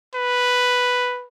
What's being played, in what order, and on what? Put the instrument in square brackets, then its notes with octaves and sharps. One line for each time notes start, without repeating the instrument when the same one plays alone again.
[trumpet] B4